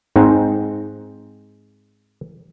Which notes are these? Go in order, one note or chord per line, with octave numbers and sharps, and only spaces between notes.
G#2 C4 D#4